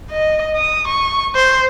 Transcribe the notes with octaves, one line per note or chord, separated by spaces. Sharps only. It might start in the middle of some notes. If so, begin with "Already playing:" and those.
D#5
D#6
C#6
C5